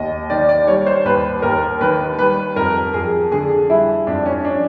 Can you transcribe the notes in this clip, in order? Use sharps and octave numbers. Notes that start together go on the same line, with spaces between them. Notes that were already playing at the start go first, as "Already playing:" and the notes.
Already playing: D#2 D#5
D#3 D5
D5
G3 C#5
C5
D#2 B4
D#2 A#4
D#3 B4
G3 B4
F2 A#4
F2 G#4
D3 G#4
G3 E4
F2 D4
C#4
D4